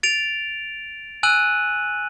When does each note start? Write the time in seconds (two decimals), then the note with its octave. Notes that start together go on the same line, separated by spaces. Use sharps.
0.03 A6 D7 F7
1.23 G#5 E6 F#6 D#7 F#7